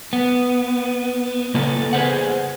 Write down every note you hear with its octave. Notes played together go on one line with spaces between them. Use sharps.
B3
C#3 A#3 B3 A4
G#4 B4 C5 F#5